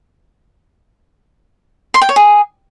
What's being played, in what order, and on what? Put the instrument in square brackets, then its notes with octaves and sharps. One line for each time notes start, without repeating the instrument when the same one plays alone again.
[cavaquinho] C6
G5
C#5
G#4